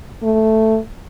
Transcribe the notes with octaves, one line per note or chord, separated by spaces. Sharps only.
A3